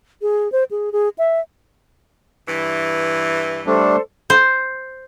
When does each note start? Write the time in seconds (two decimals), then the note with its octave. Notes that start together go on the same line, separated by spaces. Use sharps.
0.22 G#4
0.52 C5
0.71 G#4
0.92 G#4
1.18 E5
2.48 G2 E3
3.67 G3 A3 D4 A4 C5 D5
4.30 C5